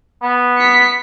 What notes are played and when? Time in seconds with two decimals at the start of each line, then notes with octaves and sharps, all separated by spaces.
0.23 B3
0.58 B6 C#7